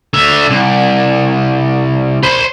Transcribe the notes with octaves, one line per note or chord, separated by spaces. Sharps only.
D3 E5
C2
C5 B5